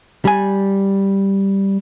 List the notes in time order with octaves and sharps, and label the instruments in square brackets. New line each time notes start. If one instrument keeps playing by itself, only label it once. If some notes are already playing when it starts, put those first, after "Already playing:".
[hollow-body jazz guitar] G3 G#5